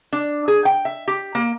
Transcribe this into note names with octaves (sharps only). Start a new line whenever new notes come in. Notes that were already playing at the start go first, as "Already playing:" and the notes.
D4
G#4
G5
E5
G4
A#3